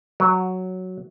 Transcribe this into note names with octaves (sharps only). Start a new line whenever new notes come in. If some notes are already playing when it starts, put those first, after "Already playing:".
F#3